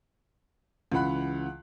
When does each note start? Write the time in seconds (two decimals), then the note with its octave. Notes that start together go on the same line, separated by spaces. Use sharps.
0.92 C#2 C#3 E3 F#5 B5 F#6